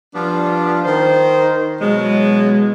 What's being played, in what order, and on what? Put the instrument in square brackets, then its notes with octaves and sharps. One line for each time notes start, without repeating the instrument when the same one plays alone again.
[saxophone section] F3 G3 B3 D4 F4
D#3 C5
B2 E3 F#3 G#3